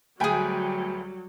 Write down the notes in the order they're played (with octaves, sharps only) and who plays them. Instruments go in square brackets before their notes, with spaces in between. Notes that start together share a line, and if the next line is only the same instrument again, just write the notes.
[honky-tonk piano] D2 G5 G#5 [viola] F#3 G3 [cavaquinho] G#4 B4